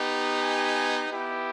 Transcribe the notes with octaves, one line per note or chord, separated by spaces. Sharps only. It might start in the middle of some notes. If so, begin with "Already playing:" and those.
Already playing: B3 D#4 G4
G#5
B3 E4 G4